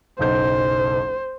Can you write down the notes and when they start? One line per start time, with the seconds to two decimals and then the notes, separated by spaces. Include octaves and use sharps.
0.19 F#1 B1 C5 G6